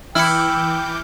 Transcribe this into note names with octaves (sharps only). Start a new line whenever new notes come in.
E3 E4 G5 D6 F6 G6 C#7